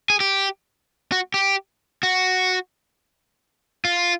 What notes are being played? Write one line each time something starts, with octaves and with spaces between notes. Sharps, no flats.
G#4
G4
F#4
G4
F#4
F4